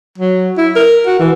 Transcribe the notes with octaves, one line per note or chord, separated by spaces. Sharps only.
F#3
E4
A#4
F#4
E3